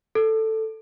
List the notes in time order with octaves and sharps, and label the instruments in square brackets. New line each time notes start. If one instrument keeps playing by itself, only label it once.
[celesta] A4